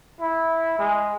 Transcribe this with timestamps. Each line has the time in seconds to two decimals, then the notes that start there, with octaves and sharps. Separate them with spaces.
0.20 E4
0.79 G#3